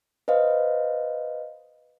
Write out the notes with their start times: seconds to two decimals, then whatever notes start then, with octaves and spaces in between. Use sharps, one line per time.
0.28 B4 C5 D#5 F5